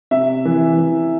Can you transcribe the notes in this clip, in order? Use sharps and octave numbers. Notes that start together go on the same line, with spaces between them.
C3 E5
E3
E3